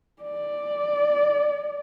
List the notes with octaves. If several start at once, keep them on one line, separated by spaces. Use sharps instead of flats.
D5